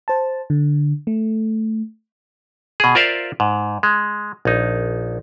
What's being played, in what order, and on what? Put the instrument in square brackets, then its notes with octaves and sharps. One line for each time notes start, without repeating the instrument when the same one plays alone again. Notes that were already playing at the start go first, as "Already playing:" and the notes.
[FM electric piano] C5 A5
D3
A3
[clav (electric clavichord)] B2 G#4
F4 A#4 C5 D5 E5 F5
G#2
G#3
A#1 D#4